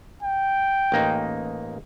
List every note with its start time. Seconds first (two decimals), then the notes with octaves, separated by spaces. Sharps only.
0.23 G5
0.92 A1 A#3 D#4